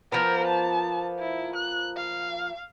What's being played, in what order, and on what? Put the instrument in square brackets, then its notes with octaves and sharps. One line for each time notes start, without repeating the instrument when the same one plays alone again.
[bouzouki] F3 A#3 B3 [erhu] A#4
[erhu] A5
E4
F#6
F5